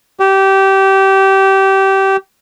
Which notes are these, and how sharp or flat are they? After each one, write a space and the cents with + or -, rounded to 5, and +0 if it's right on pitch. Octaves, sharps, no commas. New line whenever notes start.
G4 -20